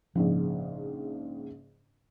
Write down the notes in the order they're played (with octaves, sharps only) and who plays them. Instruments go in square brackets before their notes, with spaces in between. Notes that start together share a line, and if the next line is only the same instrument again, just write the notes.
[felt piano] A#1 G#2 C#3 [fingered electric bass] F3